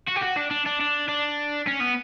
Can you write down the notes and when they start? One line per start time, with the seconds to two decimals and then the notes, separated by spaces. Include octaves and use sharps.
0.08 F#4
0.17 G4
0.22 F#4
0.37 D4
0.51 D4
0.66 D4
0.80 D4
1.08 D4
1.67 C#4
1.80 B3